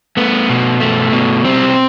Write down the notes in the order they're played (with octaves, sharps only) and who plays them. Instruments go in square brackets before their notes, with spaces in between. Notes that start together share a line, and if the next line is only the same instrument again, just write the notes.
[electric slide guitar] A3 B3
B2
A3
B2
G3 C4